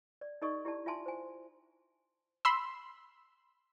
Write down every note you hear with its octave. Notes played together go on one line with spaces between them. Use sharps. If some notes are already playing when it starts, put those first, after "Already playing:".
D5
D#4 G4 A4 D5 D#5 C#6
E4 G4 D5 A5
F4 E5 G#5 A5 C6
C5 G#5
B5 C6 E6